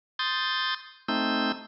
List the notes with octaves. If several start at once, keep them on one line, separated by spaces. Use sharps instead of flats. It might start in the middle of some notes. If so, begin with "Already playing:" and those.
C6 D#6 G6 A6
A3 C4 D#4 E6 G6